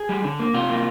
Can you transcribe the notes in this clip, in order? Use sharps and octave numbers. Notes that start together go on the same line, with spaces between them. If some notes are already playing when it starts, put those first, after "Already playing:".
Already playing: G#4
G3
D3
A#3
C3 F4
A#3